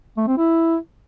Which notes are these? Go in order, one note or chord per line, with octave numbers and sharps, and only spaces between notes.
A3
C4
E4